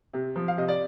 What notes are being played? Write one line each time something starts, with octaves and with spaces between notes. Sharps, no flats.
C3
F3
F5
C3 D#5
D5